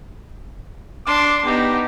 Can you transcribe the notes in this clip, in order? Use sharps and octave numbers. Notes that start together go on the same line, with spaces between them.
D4 C6 D6
B3 D#4 G4